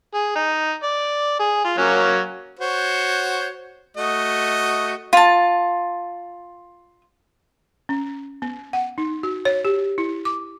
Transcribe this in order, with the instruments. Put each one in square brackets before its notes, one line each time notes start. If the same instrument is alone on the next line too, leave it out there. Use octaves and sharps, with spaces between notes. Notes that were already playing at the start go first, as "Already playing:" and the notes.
[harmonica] G#4
D#4
D5
G#4
F4
F#3 A#3 C#4
F#4 C5 C#5
A3 F#4 D#5
[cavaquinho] F4 A5
[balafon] C#4
B3
F#5
D#4
F#4
C#5
G4
E4
D6